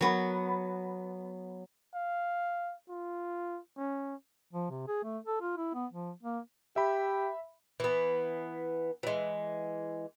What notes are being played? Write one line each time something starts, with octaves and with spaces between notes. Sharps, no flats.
F#3 B3
F5
F4
C#4
F3
C3
G#4
A3
A4
F4
E4
B3
F3
A#3
G4 E5 B5
E3 B3
E3 G#3